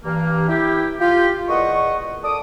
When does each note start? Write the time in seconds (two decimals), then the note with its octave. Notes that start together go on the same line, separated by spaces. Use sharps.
0.05 G2 E3 A#3
0.48 E4 G4
1.00 F4 G4
1.48 E2 A#2 D#5 F#5 C#6
2.24 A4 D5 D6 D#6